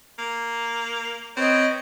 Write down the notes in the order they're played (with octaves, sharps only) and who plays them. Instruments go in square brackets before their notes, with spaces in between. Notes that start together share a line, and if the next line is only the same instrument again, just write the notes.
[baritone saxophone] A#3
[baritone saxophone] C4 [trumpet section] B4 C#5 D#5